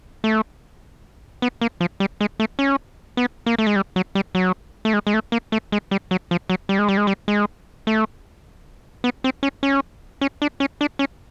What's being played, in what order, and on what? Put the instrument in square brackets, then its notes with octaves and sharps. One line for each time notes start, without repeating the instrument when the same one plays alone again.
[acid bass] A3
B3
A#3
F3
G3
G#3
A3
C#4
B3
A#3
A3
G#3
G3
F#3
G3
F#3
A3
G#3
G#3
A3
A#3
A3
G#3
G3
F#3
F3
F#3
G3
G#3
G3
G#3
G3
G#3
A3
B3
C4
C#4
C#4
C#4
D4
C#4
D4
C#4